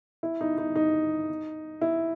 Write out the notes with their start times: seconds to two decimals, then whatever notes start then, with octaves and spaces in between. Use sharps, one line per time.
0.23 E4
0.41 D#4
0.58 D#4
0.76 D#4
1.81 E4